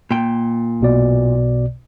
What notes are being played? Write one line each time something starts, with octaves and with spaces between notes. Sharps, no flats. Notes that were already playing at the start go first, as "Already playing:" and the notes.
A#2 G5
B1 B2 D5